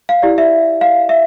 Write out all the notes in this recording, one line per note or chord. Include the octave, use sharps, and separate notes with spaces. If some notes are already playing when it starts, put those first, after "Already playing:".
F5
E4 G4 D5
E5
F5
E5